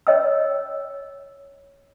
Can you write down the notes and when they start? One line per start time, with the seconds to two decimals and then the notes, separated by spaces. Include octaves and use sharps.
0.07 C#5 D#5 G5 E6